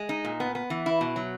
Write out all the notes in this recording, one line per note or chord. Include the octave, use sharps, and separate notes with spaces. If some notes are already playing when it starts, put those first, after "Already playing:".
Already playing: G#3
D#4
A#2
B3
B3
E3
E4
B2
F#3